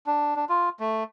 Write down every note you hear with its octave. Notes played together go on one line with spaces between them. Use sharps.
D4
D4
F4
A3